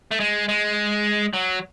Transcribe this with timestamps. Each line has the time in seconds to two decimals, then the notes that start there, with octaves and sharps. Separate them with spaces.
0.11 A3
0.20 G#3
0.49 G#3
1.33 F#3